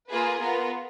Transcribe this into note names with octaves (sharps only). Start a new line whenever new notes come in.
A#3 F4 G#4 B4
B3 F4 A#4